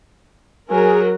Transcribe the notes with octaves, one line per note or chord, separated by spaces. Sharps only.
F#3 G#4 A#4 G#5